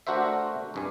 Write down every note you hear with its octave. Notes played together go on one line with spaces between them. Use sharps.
A3 D4 F#4 A#4 C5 E5
C2 G2 G#5